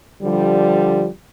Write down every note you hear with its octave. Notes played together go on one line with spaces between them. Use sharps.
D3 F3 G3